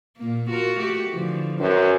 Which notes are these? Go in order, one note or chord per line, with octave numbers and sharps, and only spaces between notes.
A#2 A#3
F4 F#4 A#4
A3 F#4 G4
D3 E3 F3
F#2 F#4 B4 C5